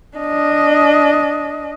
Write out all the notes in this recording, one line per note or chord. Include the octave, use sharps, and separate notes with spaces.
D4 D#5